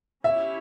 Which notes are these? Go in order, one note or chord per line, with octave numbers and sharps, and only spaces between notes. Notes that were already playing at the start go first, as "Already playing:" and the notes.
C#4 E4 G4 C#5 E5